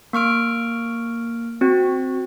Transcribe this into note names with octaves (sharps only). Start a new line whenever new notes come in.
A#3 C#6 F6 D7
C4 F#4